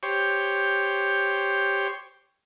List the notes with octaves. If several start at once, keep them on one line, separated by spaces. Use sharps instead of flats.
G4 C5 C#5